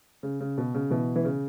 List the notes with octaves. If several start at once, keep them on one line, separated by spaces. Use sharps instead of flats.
C#3
C#3
B2
C#3
B2 E3
E3
C#3